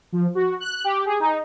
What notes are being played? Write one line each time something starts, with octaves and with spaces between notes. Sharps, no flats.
F3
F#4
F#6
G4
G#4
D#4